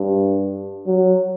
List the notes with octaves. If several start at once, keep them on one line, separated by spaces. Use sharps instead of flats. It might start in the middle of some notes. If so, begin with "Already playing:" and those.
Already playing: G2
F#3